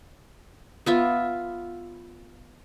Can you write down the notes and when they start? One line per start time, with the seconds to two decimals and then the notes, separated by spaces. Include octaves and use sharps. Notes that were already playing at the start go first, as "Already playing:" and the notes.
0.86 B3 F4 E5